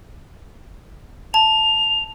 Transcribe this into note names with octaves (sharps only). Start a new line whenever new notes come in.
A5 F7